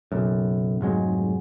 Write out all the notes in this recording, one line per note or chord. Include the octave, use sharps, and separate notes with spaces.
F#1 B1 F#2
F1 G#2 F#3 G#3